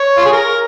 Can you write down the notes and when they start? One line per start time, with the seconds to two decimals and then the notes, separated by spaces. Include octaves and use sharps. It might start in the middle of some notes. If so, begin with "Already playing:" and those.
Already playing: C#5
0.17 F4
0.25 G#4
0.32 A#4